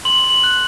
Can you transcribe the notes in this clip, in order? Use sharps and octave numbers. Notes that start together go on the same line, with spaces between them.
C6 F#7
C6
F#7
F#6